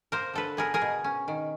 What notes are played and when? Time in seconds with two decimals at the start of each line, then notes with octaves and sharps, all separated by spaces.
0.12 A#3 A#4 C5
0.33 D3 A4 B4
0.57 B3 G#4 A#4
0.74 G#4 A#4
0.82 B2
1.04 C#4
1.28 D#3